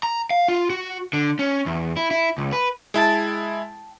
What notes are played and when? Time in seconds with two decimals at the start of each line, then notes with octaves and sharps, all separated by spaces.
0.03 A#5
0.30 F5
0.48 F4
0.70 F#4
1.13 D3
1.39 C#4
1.66 E2
1.97 E4
2.11 E4
2.38 C#2
2.52 B4
2.94 G#3 E4 G5 A5